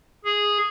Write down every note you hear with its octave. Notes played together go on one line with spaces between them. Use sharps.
G#4